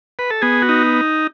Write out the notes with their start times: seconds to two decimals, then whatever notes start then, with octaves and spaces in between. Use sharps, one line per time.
0.19 B4
0.31 A4
0.42 B3 G#4
0.62 F#4
0.69 D#4